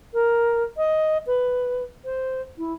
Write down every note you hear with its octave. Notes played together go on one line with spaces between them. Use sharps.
A#4
D#5
B4
C5
E4